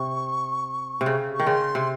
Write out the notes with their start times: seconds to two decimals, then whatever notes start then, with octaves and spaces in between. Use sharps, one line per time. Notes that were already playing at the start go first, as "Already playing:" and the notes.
Already playing: C3 C#6
1.01 C3
1.06 C#3
1.34 C#6
1.40 D#3
1.46 C#3 C6
1.75 C3